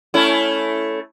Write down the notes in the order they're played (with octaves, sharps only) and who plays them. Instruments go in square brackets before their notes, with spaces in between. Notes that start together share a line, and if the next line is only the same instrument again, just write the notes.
[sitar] A3 C#4 E4